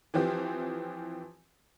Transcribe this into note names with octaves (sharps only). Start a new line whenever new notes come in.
E3 F3 C4 G4